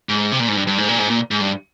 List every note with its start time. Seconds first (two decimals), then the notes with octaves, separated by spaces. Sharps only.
0.09 G#2
0.32 C3
0.40 A#2
0.48 G#2
0.56 G2
0.67 G2
0.78 G#2
0.89 A#2
0.99 G#2
1.10 A#2
1.31 G#2
1.41 G2